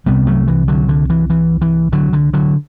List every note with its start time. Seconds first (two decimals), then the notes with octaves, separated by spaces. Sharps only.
0.06 C2 C3 G3 B3
0.27 F#3 A3
0.48 E3
0.68 D3 F#3
0.89 D3
1.10 E3
1.30 E3
1.61 E3
1.92 D3 F#3
2.13 D3
2.33 D3 F#3